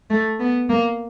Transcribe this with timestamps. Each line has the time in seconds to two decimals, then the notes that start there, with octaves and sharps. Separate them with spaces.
0.10 A3
0.40 B3
0.69 A#3